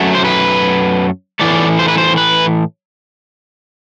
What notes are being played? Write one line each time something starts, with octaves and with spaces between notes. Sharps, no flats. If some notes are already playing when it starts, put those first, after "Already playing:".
Already playing: F#2 F#3 A3
C5
B4
A2 E3 A3 D5
C5
B4
C5
B4